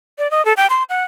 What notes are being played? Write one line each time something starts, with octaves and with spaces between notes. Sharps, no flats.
D5
D#5
A4
G5
C6
F#5